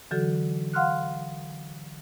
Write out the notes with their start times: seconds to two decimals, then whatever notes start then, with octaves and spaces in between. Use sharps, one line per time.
0.11 D3 E3 F#3 F#4 A4
0.74 F5 F#5 C6 F6 F#6